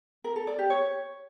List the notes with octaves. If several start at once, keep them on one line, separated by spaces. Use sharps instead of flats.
A#4
A4
D5
G4
C#5